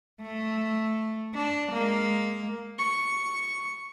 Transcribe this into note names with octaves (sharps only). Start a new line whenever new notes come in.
A3
D4
G#3 A#3
C#6